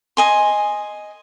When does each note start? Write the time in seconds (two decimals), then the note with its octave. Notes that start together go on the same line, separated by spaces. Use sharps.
0.17 D#5 G#5 C6